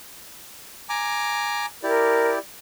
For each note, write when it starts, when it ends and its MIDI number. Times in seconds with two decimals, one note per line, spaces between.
0.89 1.66 80
0.89 1.66 82
0.89 1.66 86
1.83 2.39 64
1.83 2.39 67
1.83 2.32 70
1.83 2.39 74